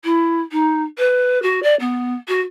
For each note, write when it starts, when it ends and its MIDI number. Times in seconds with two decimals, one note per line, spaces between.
0.04 0.41 64
0.52 0.82 63
0.98 1.39 71
1.42 1.59 66
1.63 1.75 74
1.80 2.15 59
2.28 2.41 66